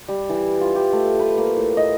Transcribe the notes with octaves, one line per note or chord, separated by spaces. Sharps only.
G3
E3
F4
G4
A3
B4
A#3
A2
D#5